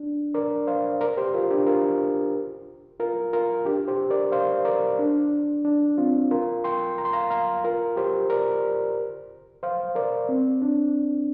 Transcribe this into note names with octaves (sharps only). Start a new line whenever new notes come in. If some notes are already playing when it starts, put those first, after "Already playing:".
Already playing: D4
A#4 D5
C5 F5
A#4 D5
G4 C5
F4 A#4
D4 G4
F4 A#4
F4 A#4
F4 A#4
D4 G4
G4 C5
A#4 D5
C5 F5
A#4 D5
D4
D4
C4 F4
F4 A#4
G5 C6
A#5
C6
F5 A#5
F5 A#5
F4 A#4
G4 C5
A#4 D5
C5 F5
A#4 D5
C4
D4